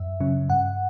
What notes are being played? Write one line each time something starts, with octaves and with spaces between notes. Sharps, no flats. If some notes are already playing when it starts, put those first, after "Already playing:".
Already playing: F#2 E5
C#3 F#3 C#4
G2 F#5